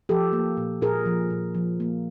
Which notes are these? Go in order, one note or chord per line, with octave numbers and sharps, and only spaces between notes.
F3 G4 A4
A#3
A#2
A#2 G#4 A#4
F3
A#2
F3
A#3